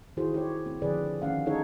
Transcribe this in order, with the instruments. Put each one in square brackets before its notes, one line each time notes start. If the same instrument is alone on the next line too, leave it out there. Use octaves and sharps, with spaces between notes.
[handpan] D#3 E4 F#4 G#4 C5
G4 C#5
C4
D3 F3 G#4 B4 D5
D#3 C#4 F5 F#5
D#4 G#4 A4 C#5